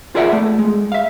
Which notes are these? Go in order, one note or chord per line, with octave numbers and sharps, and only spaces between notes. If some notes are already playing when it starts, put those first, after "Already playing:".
F4 G#4 A#4 D5 E5 F#5
A3
G#3
E5 F5